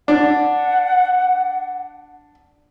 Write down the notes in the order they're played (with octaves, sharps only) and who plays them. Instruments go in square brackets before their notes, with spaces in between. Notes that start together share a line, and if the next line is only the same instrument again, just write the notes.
[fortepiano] D4 [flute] F#5